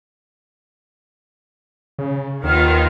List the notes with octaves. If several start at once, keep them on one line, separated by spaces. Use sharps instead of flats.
C#3
D#2 D#3 B3 F4 B4 F6